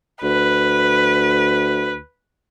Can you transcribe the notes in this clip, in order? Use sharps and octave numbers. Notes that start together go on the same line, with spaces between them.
D2 B4